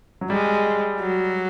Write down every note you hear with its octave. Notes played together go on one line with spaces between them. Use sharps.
F#3
G3 G#3
F#3